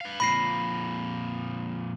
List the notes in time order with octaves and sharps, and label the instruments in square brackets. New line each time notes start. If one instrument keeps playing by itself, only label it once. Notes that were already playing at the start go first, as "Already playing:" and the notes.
[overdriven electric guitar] B4 F5
[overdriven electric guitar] F2 A#2 [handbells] B5 A#6 C7